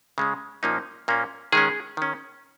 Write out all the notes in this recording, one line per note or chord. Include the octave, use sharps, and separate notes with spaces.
C#3 G#3 C#4
A#2 F3 A#3 C#4 D#4
A#2 A#3 C#4
D#3 G#3 C#4 G#4
D#3 C#4